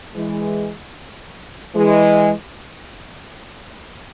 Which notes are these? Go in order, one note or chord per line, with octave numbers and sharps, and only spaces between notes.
E3 G#3
E3 G#3